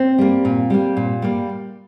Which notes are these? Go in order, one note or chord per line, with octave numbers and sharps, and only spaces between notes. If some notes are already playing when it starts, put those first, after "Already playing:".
Already playing: C4
G3 A#3
A#2
G3 A#3
A#2
G3 A#3